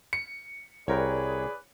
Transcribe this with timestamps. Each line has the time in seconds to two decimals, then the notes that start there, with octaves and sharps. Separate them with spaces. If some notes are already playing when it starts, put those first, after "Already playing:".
0.13 C#7
0.88 C2 G#4 A#4 B4 C#5 D5 G5